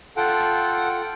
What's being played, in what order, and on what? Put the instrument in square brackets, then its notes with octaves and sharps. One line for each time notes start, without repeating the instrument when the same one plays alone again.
[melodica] F4 G5 [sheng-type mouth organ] A4 F#5